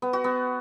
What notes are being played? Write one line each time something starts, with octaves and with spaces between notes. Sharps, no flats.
B3
F#4
B3